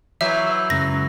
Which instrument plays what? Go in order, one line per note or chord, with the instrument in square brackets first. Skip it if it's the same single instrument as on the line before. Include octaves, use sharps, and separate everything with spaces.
[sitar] E3 F#3 [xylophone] E5 [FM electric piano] D6 E6 G6
[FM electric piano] F#2 C#3 G#3 [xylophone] A#6